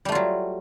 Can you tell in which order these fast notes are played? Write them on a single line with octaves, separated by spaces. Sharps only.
G3 A3 F4 F#3